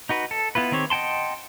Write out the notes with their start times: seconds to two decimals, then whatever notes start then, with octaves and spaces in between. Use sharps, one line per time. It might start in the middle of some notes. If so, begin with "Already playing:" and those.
0.09 D#4 F#4 B4
0.31 A4
0.55 B3 E4 F4 B4
0.72 D#3 C4 G4 C#5
0.90 D#5 F#5 G5 A5 C6